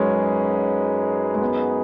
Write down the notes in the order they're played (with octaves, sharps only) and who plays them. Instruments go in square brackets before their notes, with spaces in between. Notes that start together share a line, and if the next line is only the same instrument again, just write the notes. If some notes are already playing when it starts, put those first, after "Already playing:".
Already playing: [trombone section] F#2 F#3 D#4 G#4 B4 [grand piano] G#3 C#4
[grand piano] G#3
B3